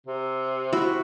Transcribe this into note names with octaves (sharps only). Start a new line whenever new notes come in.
C3
E4 F#4